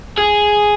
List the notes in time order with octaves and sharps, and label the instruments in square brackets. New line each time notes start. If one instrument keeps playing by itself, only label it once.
[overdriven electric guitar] G#4